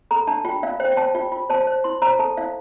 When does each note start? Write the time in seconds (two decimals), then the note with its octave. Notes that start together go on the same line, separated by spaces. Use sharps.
0.11 A4 A#5
0.27 D4 A5
0.45 F4 G5
0.63 F4 F5
0.80 C5 G5
0.92 G5
0.97 C5 A5
1.15 F4 G5
1.32 F4
1.50 C5 A5
1.67 C5
1.84 E4 C6
2.02 C5 A#5
2.19 A4 A5
2.37 E4 F5